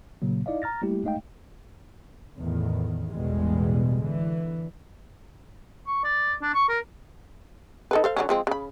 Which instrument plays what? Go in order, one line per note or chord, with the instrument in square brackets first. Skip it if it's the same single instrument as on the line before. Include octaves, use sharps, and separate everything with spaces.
[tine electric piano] A#2 C#3 F#3 A#3
D#4 E4 D5 D#5 F5
A#5 F6 A6 A#6
G3 A3 A#3 E4 G4
G#3 A3 D#4 D#5 F5 G5
[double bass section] E2 A2 D#3
A1 E2 B2 G3 G#3
D3 E3
[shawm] C#6
D5
D4
C#6
A#4
[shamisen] D#4 A4 B4
A4 C5 F5
D3 F#3 C#4
F3 G#3 C4
C#3 B5